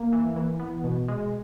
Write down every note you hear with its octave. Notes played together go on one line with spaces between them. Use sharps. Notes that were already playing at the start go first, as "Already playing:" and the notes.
Already playing: A#3
E3
E3
B3
B2
G#3